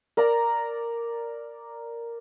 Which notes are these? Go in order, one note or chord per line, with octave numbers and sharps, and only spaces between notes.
A#4 D5 A#5